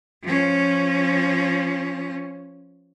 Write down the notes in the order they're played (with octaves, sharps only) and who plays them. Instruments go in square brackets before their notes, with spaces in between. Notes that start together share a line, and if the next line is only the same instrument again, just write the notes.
[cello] F3 C#4